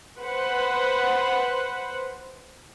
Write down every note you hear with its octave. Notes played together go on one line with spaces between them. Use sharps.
B4 C5 F#5